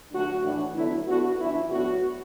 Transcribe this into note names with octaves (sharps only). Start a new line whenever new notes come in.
D2 D3 F#3 A3 D4 F#4
A2 E3 D4
D2 D3 F#3 B3 E4
D2 D3 B3 F#4
F#2 E3 D4 E4
A2 F#3 B3 D4 F#4